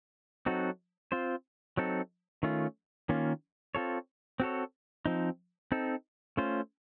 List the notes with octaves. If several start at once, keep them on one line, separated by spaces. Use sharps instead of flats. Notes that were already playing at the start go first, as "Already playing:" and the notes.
F#3 C4 D#4 F#4 A4
C4 F4 C5
F#3 C4 D#4 A4
D#3 A3 C#4 F4
D#3 A#3 C#4 F4
C4 F4 A4 C#5
C4 F#4 A4 C#5
F3 C4 D#4
C4 D#4 A4
A3 C#4 F4 C5